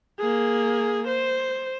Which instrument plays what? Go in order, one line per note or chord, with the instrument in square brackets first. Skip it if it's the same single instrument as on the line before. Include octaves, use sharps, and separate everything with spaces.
[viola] A#3 G#4
C5